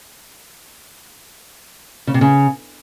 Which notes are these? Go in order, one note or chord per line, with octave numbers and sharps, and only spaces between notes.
C#3
C3
C#3